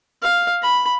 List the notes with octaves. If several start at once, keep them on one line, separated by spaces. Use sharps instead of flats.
F5
B5